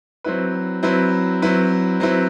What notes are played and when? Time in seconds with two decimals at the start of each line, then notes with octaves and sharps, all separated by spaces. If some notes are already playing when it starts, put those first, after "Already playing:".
0.24 F#3 C4 E4 B4
0.83 F#3 C4 E4 B4
1.42 F#3 C4 E4 B4
2.00 F#3 C4 E4 B4